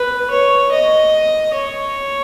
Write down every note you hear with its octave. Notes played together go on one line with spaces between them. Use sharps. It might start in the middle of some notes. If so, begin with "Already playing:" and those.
Already playing: B4
C#5
D#5
C#5